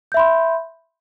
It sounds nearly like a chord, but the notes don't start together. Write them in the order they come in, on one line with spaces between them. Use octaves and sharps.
G6 E5 B5 C6